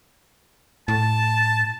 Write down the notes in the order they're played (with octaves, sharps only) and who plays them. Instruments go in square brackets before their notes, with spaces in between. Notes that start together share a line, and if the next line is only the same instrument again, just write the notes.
[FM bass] A2 [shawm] A5